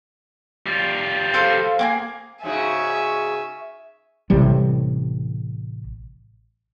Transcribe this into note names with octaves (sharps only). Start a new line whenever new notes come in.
G3 F4
A4 C5 F5
A#3 F#4 G#4
G#2 C#3 F#4 E5 G#5
A1 A2 C3 G3